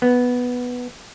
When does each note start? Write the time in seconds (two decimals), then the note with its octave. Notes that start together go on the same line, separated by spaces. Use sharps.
0.02 B3